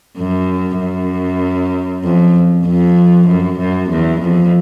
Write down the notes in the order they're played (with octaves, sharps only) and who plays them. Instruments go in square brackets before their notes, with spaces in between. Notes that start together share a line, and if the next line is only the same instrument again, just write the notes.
[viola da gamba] F#2
F#2
F2
F2
F#2
F#2
E2
F2